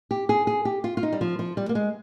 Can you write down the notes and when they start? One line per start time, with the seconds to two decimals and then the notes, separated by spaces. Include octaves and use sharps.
0.11 G4
0.29 G#4
0.47 G#4
0.65 G4
0.84 F4
0.97 F4
1.03 D#4
1.13 G3
1.21 F3
1.39 F3
1.57 G3
1.69 A#3
1.75 G#3